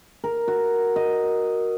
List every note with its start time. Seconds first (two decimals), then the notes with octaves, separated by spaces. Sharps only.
0.24 A#4
0.48 F#4
0.96 D#5